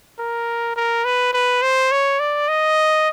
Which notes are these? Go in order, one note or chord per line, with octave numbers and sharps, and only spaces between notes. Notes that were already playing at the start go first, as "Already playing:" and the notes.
A#4
A#4
B4
B4
C5
C#5
D5
D#5